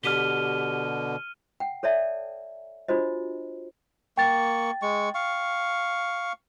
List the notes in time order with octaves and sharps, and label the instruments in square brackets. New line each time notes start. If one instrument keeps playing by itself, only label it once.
[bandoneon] B2 D3 [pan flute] G4 [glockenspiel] F6 D#7 G7
[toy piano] F#5 G5
A4 C#5 D5 E5 A5
D4 F4 F#4 C5 D#5
[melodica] A#3 C#6 [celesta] G5 A6
[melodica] G#3 C#6
F5 C#6